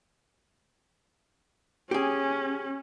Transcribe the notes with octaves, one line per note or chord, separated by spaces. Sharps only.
C#4 G4 G#4